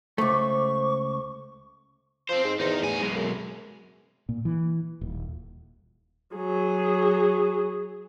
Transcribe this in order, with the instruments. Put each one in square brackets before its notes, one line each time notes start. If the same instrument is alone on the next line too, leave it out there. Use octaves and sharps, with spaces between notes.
[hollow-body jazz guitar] C#2 A3 [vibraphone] C5 D6 [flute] C#6
[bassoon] F3 [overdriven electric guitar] C4 C5
[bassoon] G#2
[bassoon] E2 [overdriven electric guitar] D#4 A#4
[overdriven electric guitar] A2 G#5
B1 G#3
[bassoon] F#2
[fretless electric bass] A#2
E3
D#1
[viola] F#3 G#4